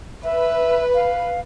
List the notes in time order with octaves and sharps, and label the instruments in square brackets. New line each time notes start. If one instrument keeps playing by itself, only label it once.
[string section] B4 [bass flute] E5
[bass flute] F5